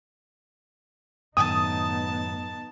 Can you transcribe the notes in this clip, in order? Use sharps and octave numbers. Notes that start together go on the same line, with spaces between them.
F#2 A2 D#3 B3 D#4 A5 D#6